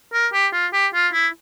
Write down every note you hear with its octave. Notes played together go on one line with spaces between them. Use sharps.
A#4
G4
F4
G4
F4
E4